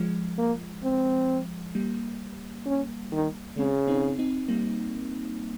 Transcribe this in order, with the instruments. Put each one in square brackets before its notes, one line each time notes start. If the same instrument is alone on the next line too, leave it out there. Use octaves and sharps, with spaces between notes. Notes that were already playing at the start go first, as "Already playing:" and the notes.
Already playing: [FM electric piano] F3 G#3
[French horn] A#3
C4
[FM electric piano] G3 A#3
[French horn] C#4
D#3
[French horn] C#3 [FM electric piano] G#3 C4
[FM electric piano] C4 D#4
C4 D#4
G3 A#3